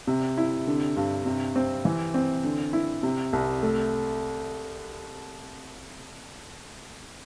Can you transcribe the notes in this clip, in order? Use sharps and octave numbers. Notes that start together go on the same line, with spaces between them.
C3
E4
D3
G2
C3
C4
E3
C4
D3
E4
C3
C2
A3